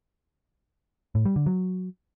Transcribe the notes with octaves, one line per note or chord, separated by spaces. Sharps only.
A2
G3
D3
F#3